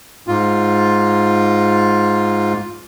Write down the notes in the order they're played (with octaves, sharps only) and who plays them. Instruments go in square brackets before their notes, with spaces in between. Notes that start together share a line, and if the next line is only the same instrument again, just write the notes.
[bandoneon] G#2 F4